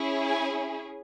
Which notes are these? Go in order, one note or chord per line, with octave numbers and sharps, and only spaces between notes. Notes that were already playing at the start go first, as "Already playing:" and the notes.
Already playing: C#4 E4 G#4
G#5